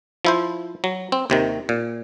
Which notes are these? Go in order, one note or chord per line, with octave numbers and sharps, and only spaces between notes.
F3 E4 C5
F#3
C4
D#2 C3 D#3
A#2